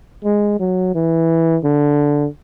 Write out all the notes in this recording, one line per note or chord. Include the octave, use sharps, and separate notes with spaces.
G#3
F#3
E3
D3